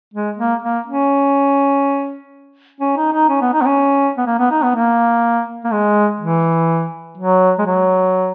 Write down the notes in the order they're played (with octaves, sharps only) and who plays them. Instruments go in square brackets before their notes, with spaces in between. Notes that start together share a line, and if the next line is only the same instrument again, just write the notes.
[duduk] G#3
A#3
A#3
C#4
C#4
D#4
D#4
C#4
B3
D#4
B3
C#4
B3
A#3
B3
D#4
B3
A#3
A#3
G#3
E3
F#3
G#3
F#3